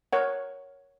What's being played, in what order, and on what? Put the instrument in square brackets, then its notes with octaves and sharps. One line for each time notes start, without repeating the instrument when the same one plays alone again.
[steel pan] A#4 C#5 F#5